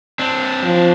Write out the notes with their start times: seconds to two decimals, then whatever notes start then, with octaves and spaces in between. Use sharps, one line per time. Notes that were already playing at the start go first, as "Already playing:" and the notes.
0.19 C4 D4
0.64 F3